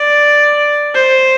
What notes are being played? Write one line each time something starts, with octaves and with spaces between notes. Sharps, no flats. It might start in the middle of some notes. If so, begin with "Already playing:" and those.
Already playing: D5
C5